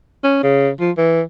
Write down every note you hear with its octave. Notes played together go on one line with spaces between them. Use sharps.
C#4
C#3
F3
E3